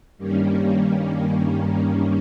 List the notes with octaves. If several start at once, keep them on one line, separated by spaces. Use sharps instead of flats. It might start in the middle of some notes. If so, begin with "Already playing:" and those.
G2 D#3 G3 A#3 C#4